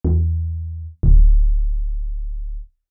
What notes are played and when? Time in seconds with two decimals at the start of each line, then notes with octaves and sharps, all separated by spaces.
0.05 E2
1.03 D1